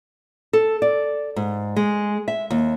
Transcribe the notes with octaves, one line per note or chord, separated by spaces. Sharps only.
A4
D5
G#2
G#3
E5
D#2